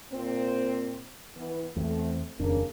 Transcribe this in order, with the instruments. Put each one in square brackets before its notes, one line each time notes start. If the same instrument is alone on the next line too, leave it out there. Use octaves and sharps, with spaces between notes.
[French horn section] A#2 C4
E3 B3
[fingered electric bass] E2 [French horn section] A3 C4
[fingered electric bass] D#1 F2 D4 [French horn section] C#3 A#3